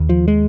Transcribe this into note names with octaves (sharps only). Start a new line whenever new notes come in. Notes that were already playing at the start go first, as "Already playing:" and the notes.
Already playing: D#2
F3
G#3